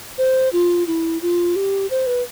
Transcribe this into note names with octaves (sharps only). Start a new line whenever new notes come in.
C5
F4
E4
F4
G4
C5
B4